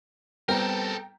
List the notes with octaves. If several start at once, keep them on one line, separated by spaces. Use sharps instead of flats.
G3 B3 C4 A4 A#4 G5 A#5